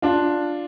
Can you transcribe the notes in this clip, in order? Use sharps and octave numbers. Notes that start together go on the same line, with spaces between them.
D4 F4